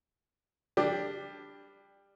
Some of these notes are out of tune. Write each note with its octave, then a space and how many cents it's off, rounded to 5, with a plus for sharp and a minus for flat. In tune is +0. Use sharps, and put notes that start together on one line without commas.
G3 +15 D4 +0 G4 +20